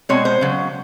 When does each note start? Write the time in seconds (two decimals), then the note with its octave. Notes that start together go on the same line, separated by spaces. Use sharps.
0.09 B2 G#3 C4 C#5
0.25 C5
0.41 C#3 F#3